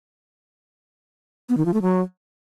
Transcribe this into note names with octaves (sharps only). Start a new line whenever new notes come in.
B3
D#3
F3
A3
F#3